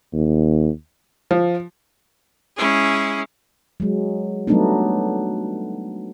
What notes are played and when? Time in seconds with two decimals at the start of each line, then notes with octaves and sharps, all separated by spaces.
0.13 D#2
1.31 F3
2.57 G#3 C#4 E4 G#4
3.80 F#3 G#3
4.47 F#3 G3 A3 B3 D4 D#4